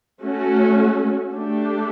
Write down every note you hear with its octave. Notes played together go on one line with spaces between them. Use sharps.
A3 C#4 F#4
A3 D4 G4